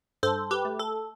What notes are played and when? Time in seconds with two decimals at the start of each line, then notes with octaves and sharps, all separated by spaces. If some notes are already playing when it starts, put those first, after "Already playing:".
0.23 G2 A4 C5
0.51 G4 B4
0.65 A3
0.79 A4